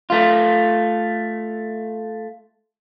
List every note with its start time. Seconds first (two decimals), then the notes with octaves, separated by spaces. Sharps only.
0.10 A3 F4